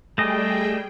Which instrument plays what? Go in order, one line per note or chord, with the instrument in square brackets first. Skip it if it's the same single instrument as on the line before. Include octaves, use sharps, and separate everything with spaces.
[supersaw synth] G3 G#4 G5 [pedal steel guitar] A3 D#5